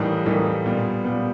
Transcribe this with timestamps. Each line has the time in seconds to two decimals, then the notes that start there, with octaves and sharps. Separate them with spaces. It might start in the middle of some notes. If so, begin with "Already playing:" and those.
Already playing: A2 E3 G3 A#3 D#4
0.26 A2 E3 G3 A#3 D#4
0.66 A#2 G3 B3
1.04 A#2 G3 B3